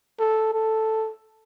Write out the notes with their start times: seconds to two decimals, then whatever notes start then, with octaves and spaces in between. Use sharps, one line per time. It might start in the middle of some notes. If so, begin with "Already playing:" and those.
0.19 A4
0.53 A4